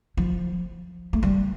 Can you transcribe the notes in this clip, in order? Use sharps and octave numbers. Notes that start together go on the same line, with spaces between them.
F3
A3
G3